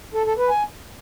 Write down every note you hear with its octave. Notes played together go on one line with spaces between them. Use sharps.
A4
A4
B4
G#5